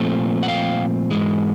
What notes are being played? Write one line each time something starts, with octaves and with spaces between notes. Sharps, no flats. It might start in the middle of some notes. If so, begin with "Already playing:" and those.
Already playing: A#2 F3 A3 C4
F#5
F5 G5
G#2 E3 G#3